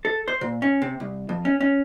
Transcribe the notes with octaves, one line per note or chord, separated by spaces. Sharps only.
A4
C5
A#2
C#4
C3
C2
F2
C#4
C#4